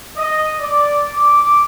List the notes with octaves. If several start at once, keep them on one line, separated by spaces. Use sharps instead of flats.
D#5
D5
D6